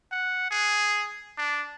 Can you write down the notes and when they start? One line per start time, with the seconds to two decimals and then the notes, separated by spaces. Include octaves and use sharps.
0.11 F#5
0.50 G#4
1.37 D4